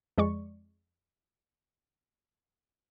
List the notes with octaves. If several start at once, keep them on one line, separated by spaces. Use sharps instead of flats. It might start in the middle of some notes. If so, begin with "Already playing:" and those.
F2 G#3 D5 C#6